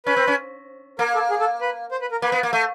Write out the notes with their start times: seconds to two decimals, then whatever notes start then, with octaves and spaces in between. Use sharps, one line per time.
0.06 C#4 B4
0.17 C4
0.28 C#4
0.99 A#3 A#4
1.15 A4
1.30 G#4
1.40 A4
1.61 B4
1.91 C5
2.01 B4
2.12 A#4
2.22 A#3 B4
2.32 B3
2.43 A#3
2.53 A3